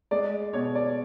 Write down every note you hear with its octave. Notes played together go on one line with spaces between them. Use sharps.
G#3 D5
B2 C#5
D5